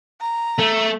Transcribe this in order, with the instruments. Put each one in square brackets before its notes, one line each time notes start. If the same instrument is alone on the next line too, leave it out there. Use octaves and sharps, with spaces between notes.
[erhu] A#5
[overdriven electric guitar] A3